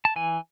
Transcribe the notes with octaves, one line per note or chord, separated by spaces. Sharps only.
A5
E3 G#5